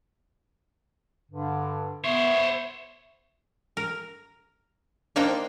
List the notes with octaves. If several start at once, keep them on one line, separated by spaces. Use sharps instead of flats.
G2 D3
B3 C5 C#5 E5
A#4
A#3 D4 D#4 C5 G5